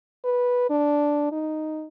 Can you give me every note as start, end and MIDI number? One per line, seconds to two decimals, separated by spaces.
0.24 0.68 71
0.70 1.29 62
1.32 1.87 63